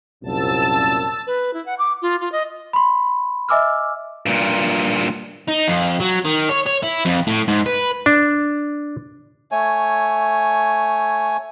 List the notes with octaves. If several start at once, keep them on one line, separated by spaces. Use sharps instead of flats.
C2 F#2 A#2 A5 E6
B4
E4
F#5
D6
F4
F4
D#5
B5 C6
D#5 E5 G#5 D6 E6 F6
G2 A#2
D#4
F2
F#3
D#3
C#5
C#5
E4
F2
A2
G#2
B4
D4
A3 C#5 G#5